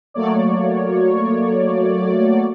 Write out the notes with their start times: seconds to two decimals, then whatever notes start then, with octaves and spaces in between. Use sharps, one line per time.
0.14 F#3 A3 A#3 C#5 D5